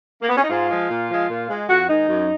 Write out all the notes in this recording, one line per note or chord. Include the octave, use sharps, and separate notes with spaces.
A#3
B3
C#4
D#4
G#2 F4
F3 G#3
A#2
F3 G#3
A#2
G#3
F2 F#4
D#3 G#3 D#4
F#2